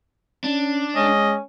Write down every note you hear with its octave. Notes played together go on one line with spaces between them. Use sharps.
C#4 D4
G#3 C#4 D#5